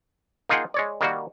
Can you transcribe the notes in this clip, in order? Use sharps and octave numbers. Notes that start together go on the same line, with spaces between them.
A#3 D#4 F4 G#4 F#5 G5
G#3 C#5 D5
D#3 G3 A#3 F#4